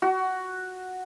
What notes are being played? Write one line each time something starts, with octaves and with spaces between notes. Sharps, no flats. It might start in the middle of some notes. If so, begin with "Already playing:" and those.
F#4